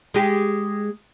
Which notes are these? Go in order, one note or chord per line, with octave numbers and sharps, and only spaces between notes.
G#3 G4